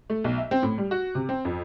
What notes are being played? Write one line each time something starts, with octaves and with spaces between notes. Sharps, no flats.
A3
B1
E5
C4
A2
G3
F#4
C3
C4
F2